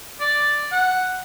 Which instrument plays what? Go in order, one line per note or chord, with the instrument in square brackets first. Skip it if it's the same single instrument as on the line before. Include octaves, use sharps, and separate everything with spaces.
[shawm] D5
F#5